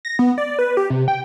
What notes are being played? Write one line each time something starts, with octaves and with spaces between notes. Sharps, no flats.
A#6
B3
D5
B4
G4
C3
G5